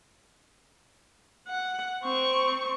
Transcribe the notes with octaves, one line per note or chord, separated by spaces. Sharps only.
F#5
C4 C#6